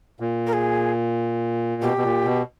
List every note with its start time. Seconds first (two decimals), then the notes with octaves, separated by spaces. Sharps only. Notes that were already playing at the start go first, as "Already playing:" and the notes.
0.20 A#2
0.47 A#4
0.53 G#4
1.82 B2 G4
1.97 B2
2.04 A#2
2.25 B2